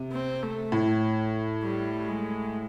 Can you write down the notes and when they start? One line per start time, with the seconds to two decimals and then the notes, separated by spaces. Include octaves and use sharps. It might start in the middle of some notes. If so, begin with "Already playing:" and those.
Already playing: C3
0.12 C4
0.43 A3
0.72 A2
1.63 G3
2.08 G#3